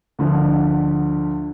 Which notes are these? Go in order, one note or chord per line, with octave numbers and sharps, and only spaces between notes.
D2 D3 F3